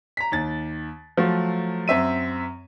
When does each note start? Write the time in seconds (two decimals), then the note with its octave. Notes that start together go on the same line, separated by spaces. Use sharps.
0.17 A#5 B6
0.32 D#2 A6
1.17 F3 F#3 A3
1.88 F#2 C4 E5 D#7